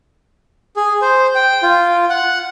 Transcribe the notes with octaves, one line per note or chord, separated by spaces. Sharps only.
G#4
C5
G5
F4
F#5